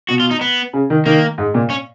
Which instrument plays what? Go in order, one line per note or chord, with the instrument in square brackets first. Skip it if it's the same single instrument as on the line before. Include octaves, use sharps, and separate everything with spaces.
[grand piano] B2 [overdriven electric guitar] F#4
[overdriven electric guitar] F4
D#4
B3
[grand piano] C#3
D#3
[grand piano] D#3 [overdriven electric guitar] A#3
[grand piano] G#2
A#2
[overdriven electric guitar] C#4